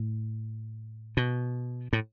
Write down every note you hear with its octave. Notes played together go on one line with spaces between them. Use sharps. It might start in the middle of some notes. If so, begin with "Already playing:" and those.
Already playing: A2
B2
A2